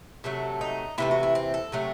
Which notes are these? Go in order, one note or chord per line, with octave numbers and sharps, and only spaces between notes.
C3 F#3 A3 A4
D#4
C3 E3 A3 E4
F#4
E4
C4
A4
C3 F#3 A3